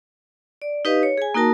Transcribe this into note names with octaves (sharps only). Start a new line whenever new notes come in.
D5
D#4 G4 B4 D#5 F5
C#5
G#4 G#5
A#3 D#4 F#4 A#4 A5